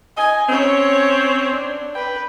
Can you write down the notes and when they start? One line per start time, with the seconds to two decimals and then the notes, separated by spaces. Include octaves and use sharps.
0.17 D#5 G#5
0.49 C4 C#4 C#5
1.53 D4
1.95 B4 G5